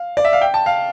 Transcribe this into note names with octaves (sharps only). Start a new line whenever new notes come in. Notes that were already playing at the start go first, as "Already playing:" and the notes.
Already playing: F5
D5
E5
F5
G5
A5
F5